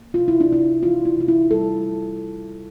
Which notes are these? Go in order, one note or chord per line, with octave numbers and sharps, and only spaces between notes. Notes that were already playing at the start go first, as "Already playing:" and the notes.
Already playing: A#3
C3 F4
E4
D4
C3 E4
E3 F4
E4
C3 F4
E4
G3 A4